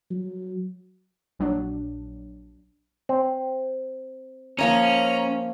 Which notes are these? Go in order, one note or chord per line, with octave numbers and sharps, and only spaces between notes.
F#3
A#1 F#3 D4
C4
F3 A#3 C#4 D#5 A#5